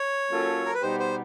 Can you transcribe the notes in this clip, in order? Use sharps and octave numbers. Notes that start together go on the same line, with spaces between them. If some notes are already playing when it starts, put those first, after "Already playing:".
Already playing: C#5
F#3 A#3 C#4 F4 A4
A#4
B4
B2 G3 B3 D#4 G4 C5
C5